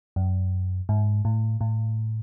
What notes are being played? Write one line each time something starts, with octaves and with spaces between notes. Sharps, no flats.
F#2
G#2
A2
A2